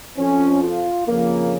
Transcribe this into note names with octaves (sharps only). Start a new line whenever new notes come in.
F2 F3 C#4
F4
F2 C#3 F3 A#3